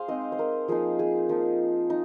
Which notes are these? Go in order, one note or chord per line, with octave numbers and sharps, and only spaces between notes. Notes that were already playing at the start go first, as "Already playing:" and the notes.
Already playing: G#4 C5 F5
G#3 C4 D#4 D#5
C5
A#4
F3 A#3 D#4 G#4
G#4
F3 A#3 D#4
D#4